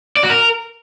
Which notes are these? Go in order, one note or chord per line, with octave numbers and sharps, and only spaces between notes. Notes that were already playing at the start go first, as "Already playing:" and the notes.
D5
F#4
A#4